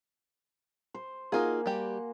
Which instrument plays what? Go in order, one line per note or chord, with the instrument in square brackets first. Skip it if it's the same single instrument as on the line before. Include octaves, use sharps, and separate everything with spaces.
[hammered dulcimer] C5
[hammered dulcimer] A#3 F#4 G#5 [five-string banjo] D#4 F4 G#4
[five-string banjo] G3 G4